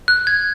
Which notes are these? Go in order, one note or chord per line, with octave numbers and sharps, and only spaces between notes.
F#6
G#6